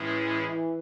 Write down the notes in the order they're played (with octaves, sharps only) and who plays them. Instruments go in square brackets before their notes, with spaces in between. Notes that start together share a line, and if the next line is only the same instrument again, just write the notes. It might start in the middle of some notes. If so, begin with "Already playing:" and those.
Already playing: [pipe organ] A2 G#3 C#4 E4 G#4 [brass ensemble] E3